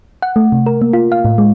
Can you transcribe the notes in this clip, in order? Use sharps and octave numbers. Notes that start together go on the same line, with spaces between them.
F#5
A3
C3
A#4
A#3
F4
F5
A2
G#3